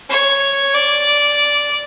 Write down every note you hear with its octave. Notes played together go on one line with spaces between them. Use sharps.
C#5
D5